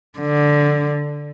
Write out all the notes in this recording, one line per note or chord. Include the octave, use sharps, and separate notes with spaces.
D3